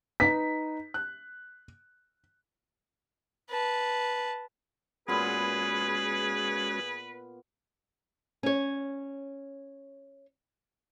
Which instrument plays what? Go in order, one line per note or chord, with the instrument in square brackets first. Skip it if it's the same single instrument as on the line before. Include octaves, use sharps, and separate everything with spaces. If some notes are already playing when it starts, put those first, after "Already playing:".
[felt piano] D#4 B4 [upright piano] B6
[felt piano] F#6
[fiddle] B4 A5
[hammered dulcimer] A#2 B3 B5 [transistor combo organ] G#3 C#4 F#4 [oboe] G#4 [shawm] B4
[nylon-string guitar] C#4 C#5